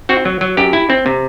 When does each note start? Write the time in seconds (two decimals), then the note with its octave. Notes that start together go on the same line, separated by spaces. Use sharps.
0.09 C4 F#4
0.25 F#3
0.41 F#3
0.57 F#2 G4
0.73 E4
0.90 C4
1.06 C3